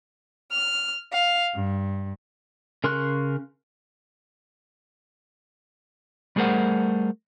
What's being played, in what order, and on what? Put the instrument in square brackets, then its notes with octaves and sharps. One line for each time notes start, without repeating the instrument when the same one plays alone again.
[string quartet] F6
F5
G2
[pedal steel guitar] C#3 A#4 C6 C#6 F#6
[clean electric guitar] G3 A3 G#4 A#4 C5 F#5